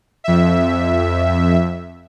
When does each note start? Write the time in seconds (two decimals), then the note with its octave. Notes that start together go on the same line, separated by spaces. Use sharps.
0.24 F2 E5